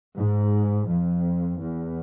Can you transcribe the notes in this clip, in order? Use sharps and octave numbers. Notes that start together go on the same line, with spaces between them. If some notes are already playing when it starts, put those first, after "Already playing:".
G#2
F2
E2